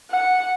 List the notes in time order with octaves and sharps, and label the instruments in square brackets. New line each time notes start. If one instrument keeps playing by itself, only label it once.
[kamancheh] F#5